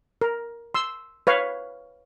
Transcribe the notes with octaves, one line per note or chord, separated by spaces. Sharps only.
A#4
C6 E6
B4 C#5 F5